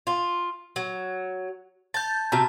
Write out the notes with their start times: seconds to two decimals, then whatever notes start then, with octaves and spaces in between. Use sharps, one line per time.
0.07 F4
0.76 F#3
1.94 A5 G6 A6
2.32 C3 F#4 A5 A#5